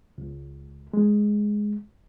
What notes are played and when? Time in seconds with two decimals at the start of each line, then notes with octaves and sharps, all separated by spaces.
0.18 C#2
0.93 G#3